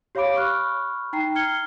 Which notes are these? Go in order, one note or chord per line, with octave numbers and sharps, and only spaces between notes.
G4 C#5 F5 B5 D6 D7
B5 C#6 F6 F#6
D#4 G5 A#5 C7
F6 G#6 C#7 G7